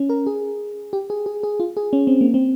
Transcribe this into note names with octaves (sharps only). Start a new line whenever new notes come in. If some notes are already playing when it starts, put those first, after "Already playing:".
Already playing: C#4
A#4
G#4
G4
G#4
G#4
G#4
F4
G#4
C#4
C4
A#3
C4